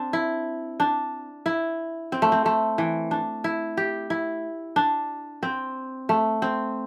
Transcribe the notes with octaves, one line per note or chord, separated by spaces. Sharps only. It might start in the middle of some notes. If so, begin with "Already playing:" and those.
Already playing: C4 D4
E4
D4
E4
C4
A3
C4
A3
E3
D4
E4
G4
E4
D4
C4
A3
C4